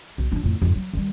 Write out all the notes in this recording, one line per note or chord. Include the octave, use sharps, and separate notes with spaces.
B1
F3 D4
F2 A2
F2 G#2
F#3
D#3 G3